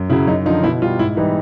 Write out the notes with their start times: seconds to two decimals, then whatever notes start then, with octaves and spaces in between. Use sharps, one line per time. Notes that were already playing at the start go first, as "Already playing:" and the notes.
Already playing: F#2
0.10 C#3 F#3 E4
0.27 F#2 D#4
0.45 D3 F3 D#4
0.63 B2 E4
0.82 G3 F4
0.99 G#2 E4
1.17 E3 G3 D#4